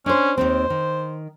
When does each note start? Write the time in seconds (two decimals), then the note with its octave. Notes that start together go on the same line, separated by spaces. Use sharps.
0.06 C#4 D4 C5
0.37 D#2 D#3 C4 C5
0.70 D#3